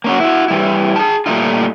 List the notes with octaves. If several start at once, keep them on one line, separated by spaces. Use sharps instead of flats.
A#3 C#4 F#4
E4 F#4
E3 G3 E4
G#4 A5
A#2 C#3 G3 A3 D#4 F4